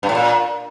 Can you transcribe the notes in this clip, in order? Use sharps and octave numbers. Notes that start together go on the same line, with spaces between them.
G2
A2
A#2